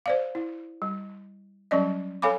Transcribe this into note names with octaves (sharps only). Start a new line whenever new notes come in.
C5 D5 F5
E4
G3
F#3 G3 C#4 D5 D#5
A4 C#5 F5 G#5 B5 D6